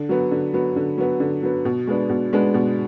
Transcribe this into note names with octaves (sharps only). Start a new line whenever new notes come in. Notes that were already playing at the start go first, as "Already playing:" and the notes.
Already playing: D3
F#3 B3
D3
F#3 B3
D3
F#3 B3
D3
F#3 B3
B2
G#3 B3 D4
B2
G#3 B3 D4
B2